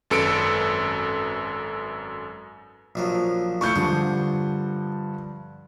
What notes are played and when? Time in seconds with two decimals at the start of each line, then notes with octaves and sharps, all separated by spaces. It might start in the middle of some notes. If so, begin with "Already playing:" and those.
0.10 G#1 F#2 A4 B4 C#7 D7
2.95 A#1 F3 F#3
3.61 A3 E4 F4 C#6 G6 C#7
3.76 G2 D3 F3 G#4